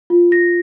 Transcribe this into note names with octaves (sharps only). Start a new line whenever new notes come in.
F4
A#6